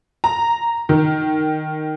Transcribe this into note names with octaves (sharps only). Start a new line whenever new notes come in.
A#5
D#3